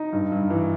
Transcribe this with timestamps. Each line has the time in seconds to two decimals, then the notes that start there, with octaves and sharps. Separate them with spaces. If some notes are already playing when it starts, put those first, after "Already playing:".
Already playing: D#4
0.12 G2
0.32 G2
0.50 E3